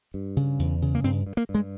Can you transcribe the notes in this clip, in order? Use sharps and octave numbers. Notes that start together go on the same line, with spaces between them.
G2
C#3
E2
C#3
A#3
G2 C4
G2
A#3
G2
G#3